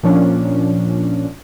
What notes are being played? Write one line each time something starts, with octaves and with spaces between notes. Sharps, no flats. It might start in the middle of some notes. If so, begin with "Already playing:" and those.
A#2 F3 C#4 D4